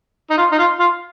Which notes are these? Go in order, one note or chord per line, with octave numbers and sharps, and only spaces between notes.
D#4
F4
D#4
F4
F4